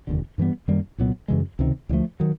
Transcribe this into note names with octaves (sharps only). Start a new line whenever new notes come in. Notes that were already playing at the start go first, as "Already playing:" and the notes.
F1 D#2 D3
G2 E3 G3 B3
F#2 D#3 G3 A#3
C2 A#2 F#3 B3
F#2 C#3 E3 G#3
C#2 C3 D#3
D2 D3 F3 A3
D#3 F#3